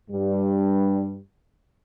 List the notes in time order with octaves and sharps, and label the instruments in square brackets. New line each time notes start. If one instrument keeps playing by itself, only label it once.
[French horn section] G2 G3